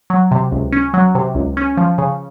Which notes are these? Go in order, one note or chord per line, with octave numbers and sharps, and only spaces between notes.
F#3
C3
C#2
C#4
F#3
C3
C#2
C#4
F3
C#3